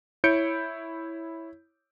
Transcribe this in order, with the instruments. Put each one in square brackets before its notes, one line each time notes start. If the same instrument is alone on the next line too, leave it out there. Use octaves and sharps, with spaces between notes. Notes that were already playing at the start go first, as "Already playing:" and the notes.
[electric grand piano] E4 C#5 G6 C#7 D7